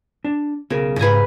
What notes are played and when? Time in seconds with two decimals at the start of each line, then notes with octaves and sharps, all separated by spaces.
0.24 D4
0.70 B1 C#3 A#4
0.99 G#2 B4 G#5 A#5